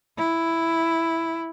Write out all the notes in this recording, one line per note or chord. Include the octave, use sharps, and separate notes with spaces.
E4